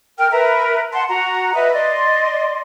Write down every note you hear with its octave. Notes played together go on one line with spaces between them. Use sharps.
A#4 G5 F6
A#4 B4 E5 A#5
F#5 A5 C6
F#4 F#5 A#5
B4 D#5 E5
D5 D#5 C6